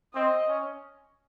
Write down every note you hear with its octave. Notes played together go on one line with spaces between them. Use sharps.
C4 D#5
C#4